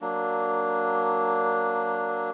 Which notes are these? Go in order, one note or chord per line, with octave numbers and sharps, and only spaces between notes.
F#3 A#3 D4